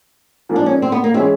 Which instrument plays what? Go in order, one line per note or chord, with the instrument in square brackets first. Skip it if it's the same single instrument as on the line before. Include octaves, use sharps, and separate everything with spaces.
[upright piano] G#2 F3 A#3
[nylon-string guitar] D4
C#4
C4
B3
A#3
[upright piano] E3 G#3 C#4 E4 [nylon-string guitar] C4